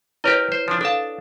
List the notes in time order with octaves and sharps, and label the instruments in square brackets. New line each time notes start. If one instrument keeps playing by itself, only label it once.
[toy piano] E4 B4 C#5 [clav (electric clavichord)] G4 A#4 D#5
[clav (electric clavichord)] C5
F3 D4
[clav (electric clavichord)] D4 A5 [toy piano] A4 F5